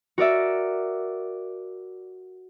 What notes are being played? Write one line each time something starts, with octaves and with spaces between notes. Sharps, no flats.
F#4 A#4 D5 E5